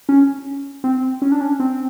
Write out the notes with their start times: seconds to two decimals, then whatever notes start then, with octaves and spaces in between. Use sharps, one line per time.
0.09 C#4
0.84 C4
1.22 C#4
1.32 D4
1.41 C#4
1.60 C4